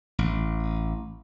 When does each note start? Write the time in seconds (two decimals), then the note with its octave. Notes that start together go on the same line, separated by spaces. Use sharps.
0.19 A1